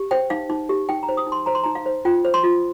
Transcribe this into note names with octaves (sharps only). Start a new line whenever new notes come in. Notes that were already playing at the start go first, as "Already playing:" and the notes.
Already playing: G4
C5 G5
D#4 F5
D#4
G4
D#4 G5
A#5
C5
D#6
D#4
C6
C5 A#5
C6
D#4 A#5
F5
C5
F4 G5
C5
C6
F4